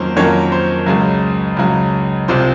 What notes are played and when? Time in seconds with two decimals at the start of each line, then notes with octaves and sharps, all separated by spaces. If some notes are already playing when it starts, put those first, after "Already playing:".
Already playing: F2 D#3 F#3 A#3 C#4 C5
0.16 F2 D#3 F#3 A#3 C#4 C#5
0.52 C5
0.86 C#2 C#3 F#3
1.57 C#2 C#3 F#3
2.28 C2 C3 F3 C5